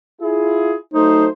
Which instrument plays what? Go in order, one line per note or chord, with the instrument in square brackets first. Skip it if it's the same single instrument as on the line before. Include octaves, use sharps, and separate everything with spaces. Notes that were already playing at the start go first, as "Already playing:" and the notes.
[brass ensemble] E4 F4 G#4
[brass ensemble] F#3 A3 C5 [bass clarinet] D#4